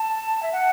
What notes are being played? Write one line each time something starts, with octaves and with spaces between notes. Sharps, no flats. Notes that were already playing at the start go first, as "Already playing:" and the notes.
Already playing: A5
E5
F#5